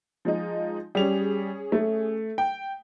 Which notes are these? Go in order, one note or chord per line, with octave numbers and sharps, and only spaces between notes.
F3 G#3 D#4
G3 C#4 G#4 F7
A3
G5